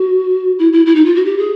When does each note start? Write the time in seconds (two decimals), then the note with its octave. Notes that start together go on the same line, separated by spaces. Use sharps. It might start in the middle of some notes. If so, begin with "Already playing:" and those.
Already playing: F#4
0.59 E4
0.73 E4
0.86 E4
0.95 D#4
1.05 F4
1.16 F#4
1.25 G4
1.38 G#4